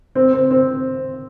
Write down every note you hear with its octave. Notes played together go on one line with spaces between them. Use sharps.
C4
C4
C4